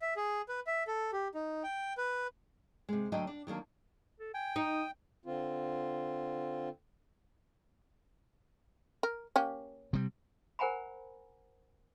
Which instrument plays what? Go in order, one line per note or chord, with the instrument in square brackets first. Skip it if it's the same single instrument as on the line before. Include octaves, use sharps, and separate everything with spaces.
[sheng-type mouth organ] E5
G#4
B4
E5
A4
G4
D#4
G5
B4
[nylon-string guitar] C3 G#3
D2 F#3 D4 D#5 G5
D4
D#3 F#3 A#3 D4
[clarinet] A4
[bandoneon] G5 [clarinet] G#5
[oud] D#4 [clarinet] D#6
[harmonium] D3 C4 F4
[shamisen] A#4
A#3 C#4 G4
[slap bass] C3 G3
[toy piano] A#4 C5 F#5 G#5 A#5 B5